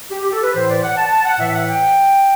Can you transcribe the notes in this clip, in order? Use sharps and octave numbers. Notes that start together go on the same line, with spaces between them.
G4
G4
A4
B4
A2 E3 C5
D5
F#5
A5
A5
F#5
A2 E3 E5
F#5
G5